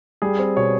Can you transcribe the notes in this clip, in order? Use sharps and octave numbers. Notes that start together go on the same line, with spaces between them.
G3 G#4
C4
B2 C#5